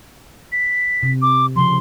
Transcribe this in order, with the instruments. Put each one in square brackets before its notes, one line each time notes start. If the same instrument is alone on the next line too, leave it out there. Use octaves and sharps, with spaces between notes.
[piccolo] B6
[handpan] C3
[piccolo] D6
[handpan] C#3 F3 [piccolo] C6